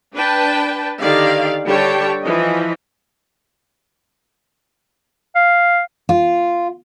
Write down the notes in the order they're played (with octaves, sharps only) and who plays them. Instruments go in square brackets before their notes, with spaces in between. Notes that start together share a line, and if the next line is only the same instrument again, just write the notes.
[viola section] D4 B4 G5 A5
D3 D#3 G4 D5 F5
D3 G3 G4 C#5 G5 A5
E3 F3 D#5
[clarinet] F5
[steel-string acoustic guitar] F4